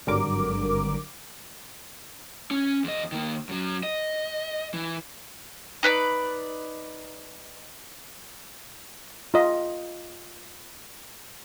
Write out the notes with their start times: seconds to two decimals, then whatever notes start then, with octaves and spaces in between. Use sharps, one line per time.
0.07 G#1 G2 D3 F#3 A#4 D6
2.51 C#4
2.84 E2 D#5
3.12 D#3 A#3
3.49 F#2 F#3
3.83 D#5
4.74 E3
5.83 D#4 B4 C5 D5
9.34 F4 D#5